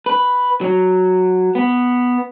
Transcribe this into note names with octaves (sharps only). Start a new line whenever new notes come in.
B4
F#3
B3